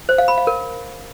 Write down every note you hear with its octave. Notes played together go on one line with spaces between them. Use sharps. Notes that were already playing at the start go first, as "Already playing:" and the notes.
C5
F5
B5
F5
A#4